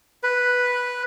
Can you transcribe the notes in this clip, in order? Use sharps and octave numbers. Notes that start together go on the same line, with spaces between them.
B4